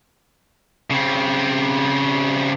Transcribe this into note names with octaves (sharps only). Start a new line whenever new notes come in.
C#3 C4